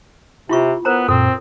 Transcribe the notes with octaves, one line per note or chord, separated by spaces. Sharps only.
C3 E4 F4 C#6
B3 A#4 C5 A#5
F#2 A#2 C4 A4